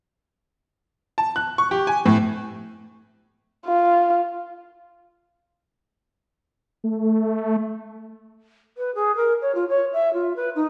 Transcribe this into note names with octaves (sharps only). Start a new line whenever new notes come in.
A5
F#6
C#6
G4
G#5
A2
F4
A3
B4
G#4
A#4
C#5
F4
C#5
E5
F4
B4
D#4